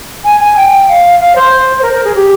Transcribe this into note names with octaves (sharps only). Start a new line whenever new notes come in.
G#5
G#5
G5
F5
F5
C5
A#4
A#4
G#4
G4